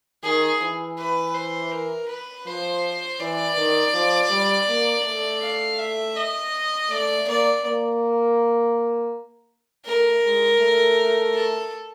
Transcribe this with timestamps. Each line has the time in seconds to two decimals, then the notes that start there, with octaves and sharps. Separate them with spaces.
0.23 D#3 G#4
0.62 E3
0.98 B4
1.34 C5
1.72 A#4
2.09 B4
2.46 F3 C5
3.20 E3 D5
3.57 D#3
3.94 F3
4.30 G3
4.69 A#3
5.04 A3
5.42 F5
5.79 E5
6.16 D#5
6.90 A3 D5
7.27 A#3 D5
7.65 A#3
9.86 A3 A#4
10.24 G#3
10.60 A3
11.34 A4